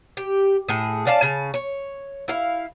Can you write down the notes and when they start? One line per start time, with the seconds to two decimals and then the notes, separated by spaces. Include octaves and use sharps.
0.17 G4
0.68 A2 G#4
1.07 C#4 D5 F5 A5
1.22 C#3 C#4 A5
1.54 C#5
2.28 E4 F5